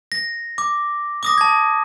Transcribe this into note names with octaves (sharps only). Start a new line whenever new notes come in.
A#6
D6
D6 D#6 A#6
A5 G#6